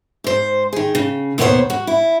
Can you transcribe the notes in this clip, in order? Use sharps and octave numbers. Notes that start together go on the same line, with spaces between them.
G#2 C5
D#3 G#4
C#3
D#2 B2 B3 D4 C5 C#5
F#4
E4